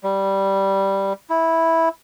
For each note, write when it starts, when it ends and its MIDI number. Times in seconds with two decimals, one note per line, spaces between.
0.04 1.13 55
1.30 1.89 64